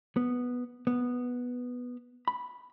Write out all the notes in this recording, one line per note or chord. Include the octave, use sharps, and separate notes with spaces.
B3
B3
B5